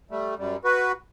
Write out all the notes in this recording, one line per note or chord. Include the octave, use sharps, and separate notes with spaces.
G3 A3
F#2 G3
F#4 B4